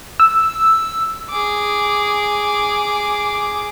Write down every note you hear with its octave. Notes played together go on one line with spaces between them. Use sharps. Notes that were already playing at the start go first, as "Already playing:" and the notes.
E6
G#4 D6